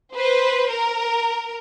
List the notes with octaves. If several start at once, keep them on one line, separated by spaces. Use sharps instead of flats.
B4 C5
A#4